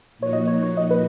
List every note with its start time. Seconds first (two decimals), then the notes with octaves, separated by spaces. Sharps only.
0.18 A#2 F3 A#3 D#4 F#4 C#5
0.33 D#5
0.47 C#5
0.62 C#5
0.77 D#5
0.91 B4